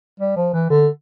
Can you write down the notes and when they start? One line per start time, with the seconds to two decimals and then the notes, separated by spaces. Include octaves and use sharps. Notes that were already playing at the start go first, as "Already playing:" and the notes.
0.20 G3
0.36 F3
0.54 E3
0.70 D3